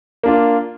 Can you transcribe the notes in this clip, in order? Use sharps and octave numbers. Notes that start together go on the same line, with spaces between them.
A#3 D4 F4